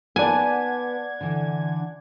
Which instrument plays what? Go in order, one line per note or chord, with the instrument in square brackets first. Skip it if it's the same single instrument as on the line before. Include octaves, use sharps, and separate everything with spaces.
[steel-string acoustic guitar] B3 B4 A5 [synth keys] D5 F#5 G#6 [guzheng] G#5
[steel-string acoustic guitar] D3 E3